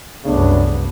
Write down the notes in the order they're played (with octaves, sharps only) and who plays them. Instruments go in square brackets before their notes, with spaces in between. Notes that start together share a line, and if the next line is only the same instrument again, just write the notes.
[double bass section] C2 F#2 [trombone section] C#3 A3 D4 [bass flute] B3